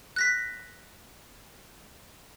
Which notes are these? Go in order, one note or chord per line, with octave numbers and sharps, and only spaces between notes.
F#6 A#6 B6